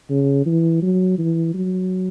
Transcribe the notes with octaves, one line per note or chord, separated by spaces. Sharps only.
C#3
E3
F#3
E3
F#3